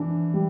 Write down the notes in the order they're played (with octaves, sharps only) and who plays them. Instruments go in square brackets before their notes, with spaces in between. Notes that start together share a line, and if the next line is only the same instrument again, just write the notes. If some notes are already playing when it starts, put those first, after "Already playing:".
Already playing: [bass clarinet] E3 [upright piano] D4
[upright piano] G3